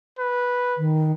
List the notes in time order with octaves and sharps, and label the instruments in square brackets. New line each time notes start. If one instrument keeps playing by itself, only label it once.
[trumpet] B4
[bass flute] D#3